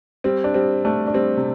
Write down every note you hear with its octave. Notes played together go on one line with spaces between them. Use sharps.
G3 C4
D4
G3 C4
A3 D4
D4
G3 C4
C3